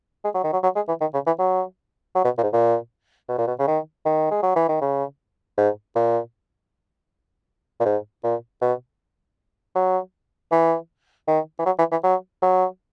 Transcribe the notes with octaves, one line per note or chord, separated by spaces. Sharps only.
G#3
F#3
D#3
F#3
F#3
G#3
E3
D#3
C#3
E3
F#3
F#3
B2
A#2
G#2
A#2
B2
A#2
B2
C#3
D#3
D#3
G#3
F#3
E3
D#3
C#3
G#2
A#2
A#2
G#2
A#2
B2
F#3
E3
D#3
E3
F#3
E3
E3
F#3
F#3